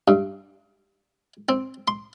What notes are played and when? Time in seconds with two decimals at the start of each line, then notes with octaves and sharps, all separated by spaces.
0.08 G2
1.49 C4
1.88 C6